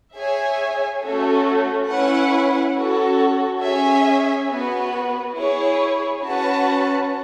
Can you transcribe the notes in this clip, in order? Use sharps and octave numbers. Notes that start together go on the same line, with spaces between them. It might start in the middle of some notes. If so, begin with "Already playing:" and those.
G#4 C#5 E5 G#5
A3 C#4 F#4 A4
C#4 E4 B4 F#5
C#4 F#4 A4
C#4 G#4 C#5 E5 G#5
B3 F#4 B4
E4 G#4 C#5
C#4 F#4 B4 F#5 A5